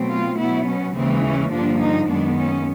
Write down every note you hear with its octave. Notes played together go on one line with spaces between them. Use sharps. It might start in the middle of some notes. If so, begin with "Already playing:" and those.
Already playing: B2 F#3 A3 C4
F4
B2 F#3 B3 E4
C#4
D#2 C#3 E3 G#3 C4
C#4
G2 D3 F3 A#3 D4
D#4
F#2 D#3 G#3 B3 D4
C#4